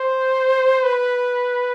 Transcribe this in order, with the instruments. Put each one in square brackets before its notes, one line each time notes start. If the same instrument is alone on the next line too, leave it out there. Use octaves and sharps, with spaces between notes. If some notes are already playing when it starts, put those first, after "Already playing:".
Already playing: [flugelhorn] C5
B4